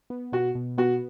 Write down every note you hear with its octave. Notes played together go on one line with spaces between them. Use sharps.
B3
B2 F#4
B2
B3 F#4